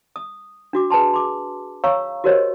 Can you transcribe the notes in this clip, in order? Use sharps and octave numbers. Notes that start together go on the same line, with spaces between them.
D#6
D4 F#4 D6
G#4 B4 G#5 A5 C6
C6 D6
C#5 F5 A#5 C#6 E6
F#4 G4 A#4 C5 C#5 D#5